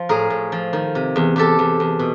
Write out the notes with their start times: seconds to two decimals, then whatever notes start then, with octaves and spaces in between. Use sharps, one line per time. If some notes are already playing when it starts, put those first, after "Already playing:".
Already playing: F3
0.09 A2 G#4 A#4
0.30 A2
0.52 F3
0.73 D#3
0.95 C3
1.16 E2
1.36 E2 G4 A4
1.59 E2
1.80 E2
1.99 B2